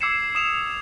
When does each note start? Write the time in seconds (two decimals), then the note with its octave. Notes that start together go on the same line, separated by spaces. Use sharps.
0.01 D6 E6 G#6 C7 C#7 E7
0.35 D#6 E7 F7